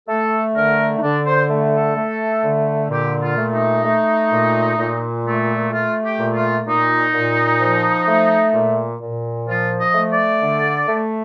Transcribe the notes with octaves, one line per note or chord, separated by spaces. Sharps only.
A3 A4
D3 A#4
D#4
D3 D4
C5
A3
A4
A3
D3
A#2 G4
F4
A3
D#4
A3
A#2
A#2
A3
A3 F4
G4
A#2
F4
A#2 D#4
A#2
F3
A3
A#2
A#2
F3 F4
D#5
A3
D5
D3
A3